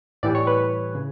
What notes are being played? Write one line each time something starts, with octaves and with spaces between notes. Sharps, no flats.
A2 E3 G3 D5
C#5
B4
C#3